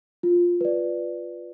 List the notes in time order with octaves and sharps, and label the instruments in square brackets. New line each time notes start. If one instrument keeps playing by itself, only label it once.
[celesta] F4
B4 D5